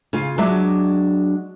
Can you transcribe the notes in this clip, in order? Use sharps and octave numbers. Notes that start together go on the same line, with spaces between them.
C#3 F4
F#3 G#3 D4 D5 E5